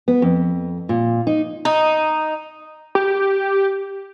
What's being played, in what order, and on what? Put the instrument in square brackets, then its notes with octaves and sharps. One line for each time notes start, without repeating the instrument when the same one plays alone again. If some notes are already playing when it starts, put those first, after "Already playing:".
[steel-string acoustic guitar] B3
F2
A#2
D#4
[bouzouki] D#4
[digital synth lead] G4